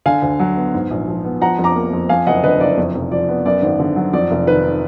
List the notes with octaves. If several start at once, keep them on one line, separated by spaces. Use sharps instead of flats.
D3 F5 G#5
D2
F#3
B3
G#2
A#1
F3
B3
F3 F#5 A#5
F2
A#5 D6
A#3
F2
F2 F5 G#5
F#1 D#5 F#5
D3 B4 D#5
F#1 D5
F2
F1
F3 D5
B3
F#2 D5
G#1
D3
F#3
F2 D5
F1
D#3 B4